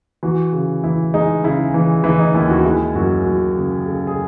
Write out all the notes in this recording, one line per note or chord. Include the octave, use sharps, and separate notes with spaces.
E3 F#4
C#3
E3 E4
G#3 D#4
C#3 E4
E3
E3 E4
D#4
D#2 E4
F#4
G#3 E4
F#2 F#4
F#2 F#4
C#3 G#4
C#3 A4
G#4